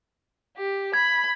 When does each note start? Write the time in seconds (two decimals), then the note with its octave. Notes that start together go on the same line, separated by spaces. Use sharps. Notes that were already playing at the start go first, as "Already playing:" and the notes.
0.56 G4
0.94 B5 G#6